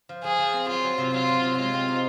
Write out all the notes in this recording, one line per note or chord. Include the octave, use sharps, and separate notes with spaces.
F3
F3 G#4
F3
C4
F#3 F4
F#3
C3
F#3 F4
F#3
C3
G#3 F4
C4
D#4